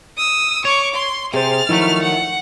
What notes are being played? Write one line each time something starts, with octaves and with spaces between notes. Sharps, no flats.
D#6 E6
C#5 C#6 D6
C6
C3 G#4 C5 F6 A6
D#3 F3 F#3 A3 E4
F#5